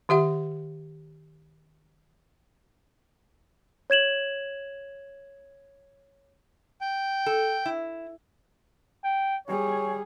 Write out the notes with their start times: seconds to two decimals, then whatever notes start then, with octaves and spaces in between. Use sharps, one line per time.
0.09 D#3 G4 E5 F#5
3.90 C#5 G#6 E7 F#7
6.81 G5
7.26 A4
7.66 E4
9.04 G5
9.47 G3 G#4 C#5